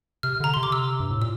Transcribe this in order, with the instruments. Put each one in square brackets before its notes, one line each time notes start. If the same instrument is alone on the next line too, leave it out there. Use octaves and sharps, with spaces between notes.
[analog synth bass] C3 [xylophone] F6
[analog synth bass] D3 [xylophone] A#5
[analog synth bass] C3 [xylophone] C6
[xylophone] D6
E6
[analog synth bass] G2
A2
[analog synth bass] A#2 [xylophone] E6